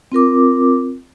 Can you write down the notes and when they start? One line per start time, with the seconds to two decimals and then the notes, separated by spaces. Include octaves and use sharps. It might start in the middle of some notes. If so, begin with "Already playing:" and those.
0.12 C4 F4 A#4 D6